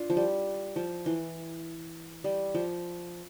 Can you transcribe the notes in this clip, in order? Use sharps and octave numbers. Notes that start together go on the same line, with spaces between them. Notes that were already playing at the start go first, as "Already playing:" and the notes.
Already playing: D4 F4
F3
G3
F3
E3
G3
F3